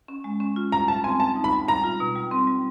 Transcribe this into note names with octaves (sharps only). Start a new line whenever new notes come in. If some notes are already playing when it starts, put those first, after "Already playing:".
C#4
G#3
C#4
F4
G3 A#5
G3 A5
C4 G#5
G3 A5
D#4
B5
G3
G3 A#5
F4
B2
G3
C4
G3